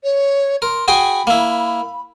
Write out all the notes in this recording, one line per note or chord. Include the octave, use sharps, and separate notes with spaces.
C#5
A#4 C6
F#4 G#4 G5 B5
A#3 E4